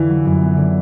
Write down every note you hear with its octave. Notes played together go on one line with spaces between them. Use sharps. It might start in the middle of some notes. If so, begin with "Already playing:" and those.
Already playing: F2 D3 E3 E4
F#3
F#2
B3
D3